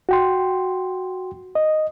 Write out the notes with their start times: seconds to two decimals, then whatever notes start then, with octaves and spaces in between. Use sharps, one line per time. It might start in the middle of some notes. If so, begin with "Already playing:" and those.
0.09 F#4 G5 C6
1.55 D#5